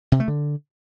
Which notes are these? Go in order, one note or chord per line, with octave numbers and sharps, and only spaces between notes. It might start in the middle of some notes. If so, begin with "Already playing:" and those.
C3
A3
D3